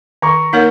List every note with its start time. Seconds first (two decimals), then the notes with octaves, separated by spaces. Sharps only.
0.22 D#3 A#5 C#6
0.53 A#3 D#4 A#4 C#5